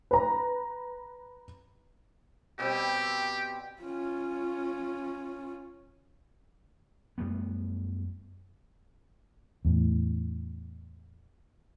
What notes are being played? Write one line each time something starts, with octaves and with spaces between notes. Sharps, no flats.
B4 A#5
B2 G3 C4 G4
C#4 F4
F#2 G3 A3 B3
E2 A2